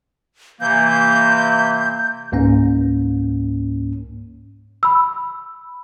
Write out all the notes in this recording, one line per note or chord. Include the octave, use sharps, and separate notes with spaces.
C3 E3 A#3 G6
C#2 G#2 A#3 C#4
B5 E6